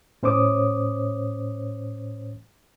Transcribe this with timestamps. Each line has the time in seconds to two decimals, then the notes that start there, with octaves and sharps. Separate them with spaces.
0.23 A2 C#4 C5 C#5 D6 D#6